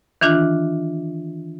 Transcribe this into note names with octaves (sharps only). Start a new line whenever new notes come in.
D#3 E3 D4 F4 F#6